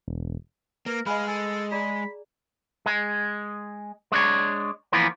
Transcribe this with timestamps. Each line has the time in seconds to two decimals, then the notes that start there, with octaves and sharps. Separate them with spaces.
0.08 E1
0.86 A#3 A#4 B4
1.06 G#3 D#5 F5 G#5 B5
1.28 A4 G#5
1.72 G#4 D5 A#5 B5
2.86 G#3
4.12 G#3 D4 C#5
4.92 E3 F3 A#3 B3